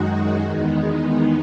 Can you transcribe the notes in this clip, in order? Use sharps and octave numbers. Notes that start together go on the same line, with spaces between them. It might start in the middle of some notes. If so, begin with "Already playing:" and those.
Already playing: F#2 D#3 G#3 D#4 F#4
E2 D#3 G#3 B3 D#4